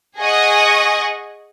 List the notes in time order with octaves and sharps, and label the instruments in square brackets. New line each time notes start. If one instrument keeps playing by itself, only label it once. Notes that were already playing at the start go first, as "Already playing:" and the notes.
[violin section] G#4 D#5 F#5 G#5 C#6 D#6